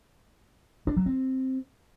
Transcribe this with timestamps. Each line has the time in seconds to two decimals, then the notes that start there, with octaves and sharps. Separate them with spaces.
0.87 D4
0.97 F#3
1.06 C4